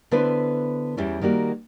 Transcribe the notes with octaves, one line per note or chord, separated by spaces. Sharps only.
D3 B3 E4 B4 C5
E2 E3 G3 C#4 E4
D#3 G3 A#3 F#4